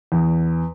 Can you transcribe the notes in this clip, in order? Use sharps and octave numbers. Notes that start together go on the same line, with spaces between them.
E2